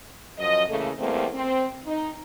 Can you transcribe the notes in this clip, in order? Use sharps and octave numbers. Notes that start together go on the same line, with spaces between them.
F#2 F3 D#5
C#3 E3 A3 A#3 A4
E2 G3 A3 A#3 C4
C4
D#4